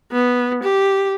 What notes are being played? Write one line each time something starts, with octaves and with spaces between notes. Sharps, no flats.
B3
G4